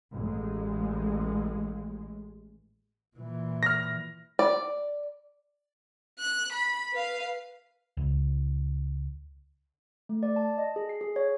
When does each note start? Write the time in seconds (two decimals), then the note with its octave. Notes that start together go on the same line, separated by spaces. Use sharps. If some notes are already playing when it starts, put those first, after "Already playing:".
0.12 A1 G#3
3.17 A#2 E3
3.63 F6 A#6
4.39 D5
6.19 F#6
6.53 B5
6.93 B4 F5
7.97 C#2
10.09 A3
10.23 D5
10.36 A5
10.58 D#5
10.76 G#4
10.89 C7
11.01 G#4
11.16 C#5